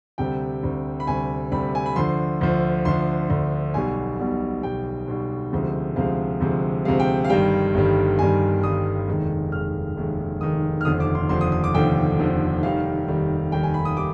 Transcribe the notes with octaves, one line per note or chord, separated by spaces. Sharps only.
D2 C3 G3 G5
D2 C3 G3
B5
D2 C3 G3 G#5
D2 C3 G3 B5
G#5
B5
D2 D3 F3 C6
D2 D3 F3
D2 D3 F3 C6
D2 D3 F3
B1 B2 G3 G#5
B1 B2 G3
B1 B2 G3 G5
B1 B2 G3
D2 C3 F3 G#3
D2 C3 F3 G#3 F5
D2 C3 F3 G#3
D2 C3 F3 G#3 F5
G5
F5
G1 G2 D#3 G3 G5
G1 G2 D#3 G3
G1 G2 D#3 G3 G#5
G1 G2 D#3 G3 D#6
F1 D#2 D#3 G#3
F1 D#2 D#3 G#3 F6
F1 D#2 D#3 G#3
F1 D#2 D#3 G#3 D#6
F6
F1 D#2 D3 F3 D#6
D6
C6
F1 D#2 D3 F3 C6
D#6
D#6
D6
F1 D#2 D3 F3 G5
F1 D#2 D3 F3
F1 D#2 D#3 G3 F5
F1 D#2 D#3 G3
F1 D#2 D#3 G3 G5
G#5
B5
D#6
D#3 G3 D6